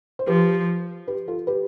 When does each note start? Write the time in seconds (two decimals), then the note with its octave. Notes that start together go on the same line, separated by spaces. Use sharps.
0.19 C5
0.27 F3 G4 B4
1.07 G4 B4
1.28 F4 A4
1.47 G4 B4